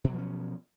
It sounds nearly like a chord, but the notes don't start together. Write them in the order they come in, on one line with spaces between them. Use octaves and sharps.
B2 F#3 F3 C#4